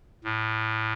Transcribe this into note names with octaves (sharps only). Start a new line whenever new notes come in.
A2